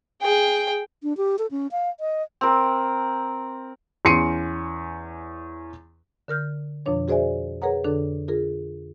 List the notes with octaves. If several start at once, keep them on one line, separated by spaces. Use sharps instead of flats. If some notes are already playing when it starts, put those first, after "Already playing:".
G#4 G5
D4
G4
A4
C#4
F5
D#5
C4 A#4
E2 C#4 C6 C7 C#7 D#7
D3 A#4 F6 G6
F2 B2 F3 D4 C#5
F#4 G#4 C5 D5 E5 G#5
G#4 A#4 B4 C#5 F#5 A#5
F2 D3 D4 A4
F4 G#4 A#4